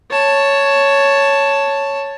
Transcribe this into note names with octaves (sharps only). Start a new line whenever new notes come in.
C#5 A5